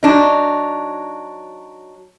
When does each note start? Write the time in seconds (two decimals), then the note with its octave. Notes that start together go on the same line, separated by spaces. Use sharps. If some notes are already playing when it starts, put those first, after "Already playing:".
0.03 F#3 D4 D#4